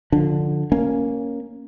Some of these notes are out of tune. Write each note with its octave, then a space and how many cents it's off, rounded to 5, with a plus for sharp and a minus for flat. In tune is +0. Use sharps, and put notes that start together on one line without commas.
D3 +5 F3 +20 D4 +0
A#3 +0 C#4 +0